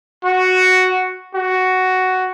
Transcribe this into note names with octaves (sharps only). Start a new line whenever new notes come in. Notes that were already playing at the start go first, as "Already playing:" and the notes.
F#4
F#4